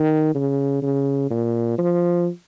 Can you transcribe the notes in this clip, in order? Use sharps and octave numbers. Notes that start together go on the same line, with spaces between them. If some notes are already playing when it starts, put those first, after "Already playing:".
Already playing: D#3
C#3
C#3
A#2
F3